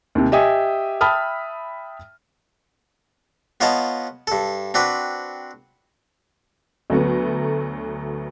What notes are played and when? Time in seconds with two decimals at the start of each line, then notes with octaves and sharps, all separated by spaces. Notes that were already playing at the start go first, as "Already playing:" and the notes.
0.15 D#2 C3
0.32 G4 D#5 E5 G#5 D#6
1.01 E5 G5 A5 B5 D#6 F6
3.61 B3 F4 C#5 D#5 F#5 A5
4.27 G2 A4
4.74 C4 D4 F#4 B4
6.90 D2 F#3 A3 B3